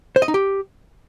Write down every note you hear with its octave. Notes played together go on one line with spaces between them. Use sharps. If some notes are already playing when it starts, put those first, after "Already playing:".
C5
D#5
D#4
G4